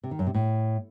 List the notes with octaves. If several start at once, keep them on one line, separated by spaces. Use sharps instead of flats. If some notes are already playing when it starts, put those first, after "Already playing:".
C3
D#3
F#2
C3
A2